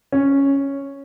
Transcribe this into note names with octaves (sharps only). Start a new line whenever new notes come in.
C#4